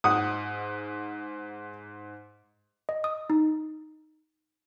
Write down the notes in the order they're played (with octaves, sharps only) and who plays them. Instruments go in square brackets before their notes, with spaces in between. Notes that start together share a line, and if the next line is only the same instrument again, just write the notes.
[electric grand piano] G#2 [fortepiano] F#5 D#6
[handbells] D#5
D#6
D#4